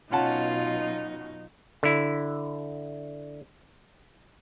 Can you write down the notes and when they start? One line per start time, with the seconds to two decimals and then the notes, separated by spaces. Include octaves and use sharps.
0.12 B2 F#3 C#4 D#4 F4 F#4 F#5 A5
1.83 D3 E4